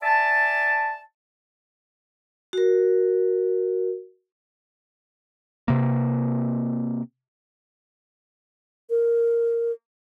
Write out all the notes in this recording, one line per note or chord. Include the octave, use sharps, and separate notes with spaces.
D5 E5 G#5 A5
F#4 A#4
C3 A#3
A#4